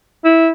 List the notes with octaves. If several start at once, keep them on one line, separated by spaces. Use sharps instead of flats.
E4